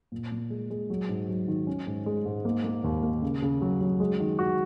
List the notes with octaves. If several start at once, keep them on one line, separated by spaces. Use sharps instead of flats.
A#2
A#2
G#3
G#3
F#3
G#2
F#3
D#3
C#4
G#2
G#3
G#2
A#3
A#3
D#2
A#3
C#3
C#3
F#3
F#3
G#3
D#3
F#4